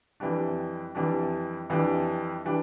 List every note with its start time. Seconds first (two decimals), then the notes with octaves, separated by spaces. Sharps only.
0.20 F2 E3 G3 D4
0.95 F2 E3 G3 D4
1.70 F2 E3 G3 D4
2.45 E3 G3 D4